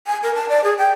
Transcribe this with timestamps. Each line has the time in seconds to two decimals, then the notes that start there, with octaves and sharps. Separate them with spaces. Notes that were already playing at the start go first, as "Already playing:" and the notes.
0.07 G#5
0.23 A#4
0.35 A5
0.49 D5
0.64 G#4
0.78 G5